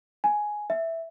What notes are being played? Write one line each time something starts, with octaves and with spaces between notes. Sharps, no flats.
G#5
E5